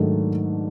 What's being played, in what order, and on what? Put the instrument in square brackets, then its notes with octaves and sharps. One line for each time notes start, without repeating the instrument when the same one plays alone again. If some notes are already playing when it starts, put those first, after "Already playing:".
Already playing: [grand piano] G#2 D#3 F#3 A3 D4